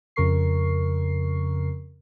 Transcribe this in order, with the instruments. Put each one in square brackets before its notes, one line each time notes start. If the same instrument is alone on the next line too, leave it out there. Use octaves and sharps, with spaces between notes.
[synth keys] F2 C#3 A#4 C#6 C7